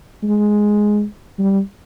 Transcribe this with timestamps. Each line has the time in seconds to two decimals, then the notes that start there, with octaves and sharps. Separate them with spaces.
0.23 G#3
1.39 G3